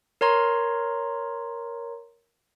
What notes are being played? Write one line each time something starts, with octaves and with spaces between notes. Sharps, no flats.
A#4 C#5 A#5 C6